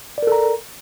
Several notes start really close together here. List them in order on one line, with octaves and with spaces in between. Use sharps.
D5 A#4 A4 A#5